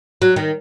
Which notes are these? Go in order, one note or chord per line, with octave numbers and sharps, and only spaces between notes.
F#3
D#3